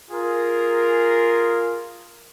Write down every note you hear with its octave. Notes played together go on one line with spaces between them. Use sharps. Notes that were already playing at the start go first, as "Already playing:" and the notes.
F4 G#4 A#4